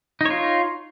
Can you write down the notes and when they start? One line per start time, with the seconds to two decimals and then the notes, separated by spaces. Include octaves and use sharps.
0.21 D#4
0.25 C#5
0.30 F4